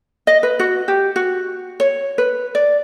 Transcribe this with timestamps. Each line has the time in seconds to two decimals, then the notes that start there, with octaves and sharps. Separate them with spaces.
0.27 D#5
0.43 B4
0.59 F#4
0.88 G4
1.16 F#4
1.80 C#5
2.18 B4
2.55 D5